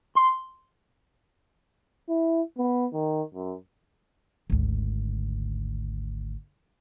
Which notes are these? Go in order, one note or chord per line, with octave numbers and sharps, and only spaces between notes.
C6
E4
B3
D#3
F#2
G#1 D2